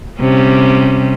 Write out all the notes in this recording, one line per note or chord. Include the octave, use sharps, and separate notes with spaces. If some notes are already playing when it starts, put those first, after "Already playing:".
C3 G3 C#4